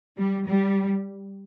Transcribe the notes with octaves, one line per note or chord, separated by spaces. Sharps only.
G3
G3